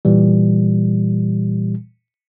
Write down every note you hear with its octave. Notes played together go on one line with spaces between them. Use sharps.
A#2 E3 G3